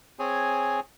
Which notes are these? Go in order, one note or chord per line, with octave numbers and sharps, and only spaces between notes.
C4 G#4 C#5 G#5